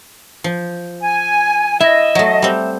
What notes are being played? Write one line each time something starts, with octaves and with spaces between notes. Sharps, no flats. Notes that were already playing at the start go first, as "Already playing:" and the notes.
F3
G#5
E4 D#5 E5
F#3 A3
G3 C4